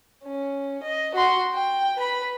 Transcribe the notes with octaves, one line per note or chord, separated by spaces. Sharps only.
C#4
D#5
F#4 C6
G5
B4 B5